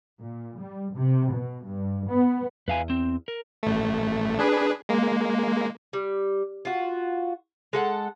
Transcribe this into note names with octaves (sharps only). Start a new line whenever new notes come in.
A#2
G3
C3
B2
G2
B3
E2 B4 F5 G#5
C4
A#4
A1 A3
D4 G#4 B4
G#3 A#3
G3
F4 F#4
G#3 A4 F#5